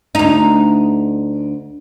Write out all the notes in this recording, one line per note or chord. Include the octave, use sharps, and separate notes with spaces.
D2 D#4